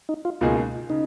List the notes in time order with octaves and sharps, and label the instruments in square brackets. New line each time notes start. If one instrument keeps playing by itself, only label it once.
[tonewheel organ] D#4
F4
[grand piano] C#2 B2 A#3 D#4 G#4 [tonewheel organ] F4
[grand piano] C#3 [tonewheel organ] D#4